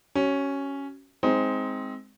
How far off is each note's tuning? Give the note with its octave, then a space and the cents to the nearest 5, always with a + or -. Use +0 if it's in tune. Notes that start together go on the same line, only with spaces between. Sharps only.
C#4 +0 F#4 +35
G#3 +0 C4 +0 D#4 +20